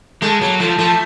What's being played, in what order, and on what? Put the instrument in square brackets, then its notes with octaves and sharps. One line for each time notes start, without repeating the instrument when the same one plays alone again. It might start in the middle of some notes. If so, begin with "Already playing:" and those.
[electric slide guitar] G#3 [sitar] A3
[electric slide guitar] F#3 [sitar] A#3
[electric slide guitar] F3 [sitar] A3
[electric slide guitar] F3 [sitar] A3